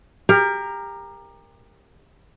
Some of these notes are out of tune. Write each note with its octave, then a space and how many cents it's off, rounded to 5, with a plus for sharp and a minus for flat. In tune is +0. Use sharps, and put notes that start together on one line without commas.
G4 +30 A#4 +0